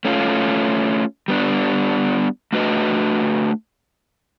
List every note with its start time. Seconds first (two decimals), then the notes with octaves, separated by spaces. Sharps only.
0.05 A3 C#4 F4
1.28 G3 B3 D4
2.52 A3 D4 F#4 B4 D#5